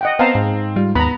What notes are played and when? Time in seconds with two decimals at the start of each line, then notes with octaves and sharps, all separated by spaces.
0.01 D#5 F#5 G5
0.19 B3 C4 C5 F5 A5 A#5
0.35 G#2 C4
0.76 G3 F4
0.95 D#2 B3 A#5 B5